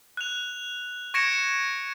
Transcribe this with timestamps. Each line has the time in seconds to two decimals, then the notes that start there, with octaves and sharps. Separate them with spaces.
0.17 F#6 F7
1.14 C#6 G#6 A#6 C#7 D7 E7